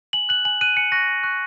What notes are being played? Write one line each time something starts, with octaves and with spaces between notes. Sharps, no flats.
G#5 F#7
F#6 F#7
G#5 F#7
F#6 D#7
G#5 C#7
C#6 F#6 A#6
G#5
C#6 F#6